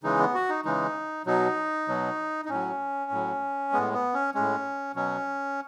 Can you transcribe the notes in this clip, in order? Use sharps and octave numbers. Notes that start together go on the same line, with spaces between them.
C#3 E3 G#3 D#4
B3
F#4
D#4
C#3 E3 G#3 D#4
B2 F#3 D#4
B2 F#3
D#4
A2 F#3 C#4
A2 F#3
A2 G#3 B3
B3
C#4
A2 G#3 C#4
B2 F#3 C#4